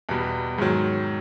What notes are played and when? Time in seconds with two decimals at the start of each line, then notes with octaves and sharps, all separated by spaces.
0.09 E2 B2 G3
0.58 G#2 D#3 F#3